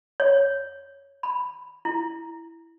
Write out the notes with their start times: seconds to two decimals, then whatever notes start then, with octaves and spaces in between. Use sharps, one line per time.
0.20 C#5
1.23 B5
1.85 E4